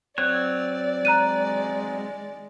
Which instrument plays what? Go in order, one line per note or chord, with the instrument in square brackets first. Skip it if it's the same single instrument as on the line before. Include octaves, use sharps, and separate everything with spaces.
[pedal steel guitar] F#3 C4 C#5 [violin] D5 [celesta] F#6
[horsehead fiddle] G#3 [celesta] A#5 F#6 D#7